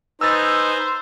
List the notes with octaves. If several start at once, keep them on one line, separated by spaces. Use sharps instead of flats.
D#4 B4 C5 G#5 A#5 E6 A6